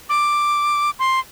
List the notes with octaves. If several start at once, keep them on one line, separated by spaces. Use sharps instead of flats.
D6
C6